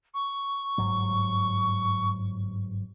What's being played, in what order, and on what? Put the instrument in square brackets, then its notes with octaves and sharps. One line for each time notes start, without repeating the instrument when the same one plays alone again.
[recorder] C#6
[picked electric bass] G1 G#2 F#3